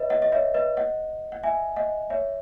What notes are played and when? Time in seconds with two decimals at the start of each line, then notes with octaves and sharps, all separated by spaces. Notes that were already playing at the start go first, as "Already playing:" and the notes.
Already playing: B4 C#5 D#5 E5
0.10 D#5 F#5
0.22 D#5
0.32 C#5 E5
0.54 B4 D#5
0.77 D#5 F#5
1.32 F#5
1.43 E5 G#5
1.76 D#5 F#5
2.10 C#5 E5